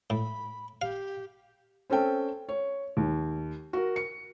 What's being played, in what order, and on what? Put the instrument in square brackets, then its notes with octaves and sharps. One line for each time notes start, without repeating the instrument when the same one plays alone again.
[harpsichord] A2 [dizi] B5
[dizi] G4 [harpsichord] F5
[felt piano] C4 C#4 A4 G5
C#5
D#2
F#4 A#4
C#7